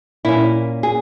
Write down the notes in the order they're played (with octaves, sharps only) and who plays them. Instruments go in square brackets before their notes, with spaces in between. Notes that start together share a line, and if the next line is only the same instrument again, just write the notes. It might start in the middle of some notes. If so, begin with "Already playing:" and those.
[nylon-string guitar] A#2 A#3 C#4 E4
G#4